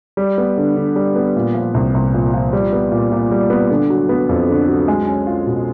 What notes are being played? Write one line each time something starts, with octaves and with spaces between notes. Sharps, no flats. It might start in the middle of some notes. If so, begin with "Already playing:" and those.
G3
B3
D3
D3
G3
B3
A#2
F3
C2
C2
A#2
F3
G3
B3
A#2
A#2
G3
B3
D3
F#3
B3
F2
D3
F#3
G#3
C#4
F4
B2